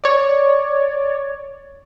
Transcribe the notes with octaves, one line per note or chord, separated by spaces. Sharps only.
C#5 D5